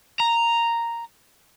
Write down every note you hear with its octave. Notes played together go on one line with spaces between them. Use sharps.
A#5